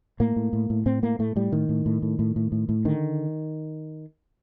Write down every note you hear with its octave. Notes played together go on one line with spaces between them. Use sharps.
A2 A#3
A2
A2
A2
A2 C4
A2 A#3
A2 A3
A2 G3
A2 D#3
A2
A2
A2
A2
A2
A2
A2
D3 D#3